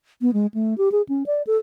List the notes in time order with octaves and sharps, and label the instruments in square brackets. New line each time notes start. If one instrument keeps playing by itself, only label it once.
[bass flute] B3
G#3
A3
G4
G#4
C#4
D5
A4